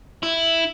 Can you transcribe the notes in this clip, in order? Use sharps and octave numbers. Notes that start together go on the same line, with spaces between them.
E4